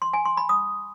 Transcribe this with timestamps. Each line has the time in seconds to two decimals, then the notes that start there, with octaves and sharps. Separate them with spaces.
0.02 C6
0.14 G#5
0.25 C6
0.37 B5
0.49 D#6